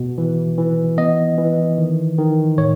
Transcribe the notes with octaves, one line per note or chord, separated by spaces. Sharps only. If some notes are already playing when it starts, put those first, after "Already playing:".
Already playing: B2
E3
E3
B3 D#5
E3
D#3
D#3
A2 C#5